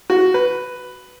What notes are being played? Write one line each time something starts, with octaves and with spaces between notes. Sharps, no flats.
F#4
B4